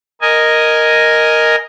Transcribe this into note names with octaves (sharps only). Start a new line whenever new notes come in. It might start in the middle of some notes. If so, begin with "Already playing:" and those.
A#4 D#5 G#5